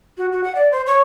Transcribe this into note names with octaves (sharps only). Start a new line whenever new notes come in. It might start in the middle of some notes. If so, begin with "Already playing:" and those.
F#4
F#4
F#5
D5
C5
C#5